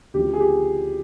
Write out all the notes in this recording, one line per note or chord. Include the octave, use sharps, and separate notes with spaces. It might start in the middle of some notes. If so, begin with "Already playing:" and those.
D2 C#3 F3 G4
G#4
G4